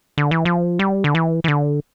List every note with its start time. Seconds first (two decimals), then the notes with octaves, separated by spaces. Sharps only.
0.18 D3
0.31 E3
0.45 F3
0.79 G3
1.04 D3
1.15 E3
1.44 E3
1.48 D3